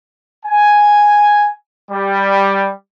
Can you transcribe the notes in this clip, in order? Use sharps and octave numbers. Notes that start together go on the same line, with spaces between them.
G#5
G3